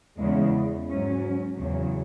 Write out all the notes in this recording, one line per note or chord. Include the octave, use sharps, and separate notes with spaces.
E2 C#3 G#3
G#2 F#3 C#4
E2 C#3 F#3